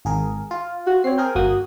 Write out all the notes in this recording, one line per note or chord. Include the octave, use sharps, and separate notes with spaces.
G#1 G#4 A#4
F4
F#4
C4 C#5 C7
G#4 A#4 G5
G1 A#3 F#4 D#6